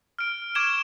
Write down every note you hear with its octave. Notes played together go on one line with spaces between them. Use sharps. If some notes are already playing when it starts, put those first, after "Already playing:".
F6 D7
C#6 D6 G#6 D7 E7 G7